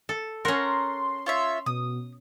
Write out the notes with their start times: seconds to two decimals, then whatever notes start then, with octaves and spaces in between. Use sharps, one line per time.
0.09 A4
0.45 C#4 A4 A#4 F#5 A#5 C6
1.26 F4 C#5 E5
1.66 B2 D#6